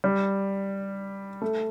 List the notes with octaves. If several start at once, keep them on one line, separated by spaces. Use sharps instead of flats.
G3
A3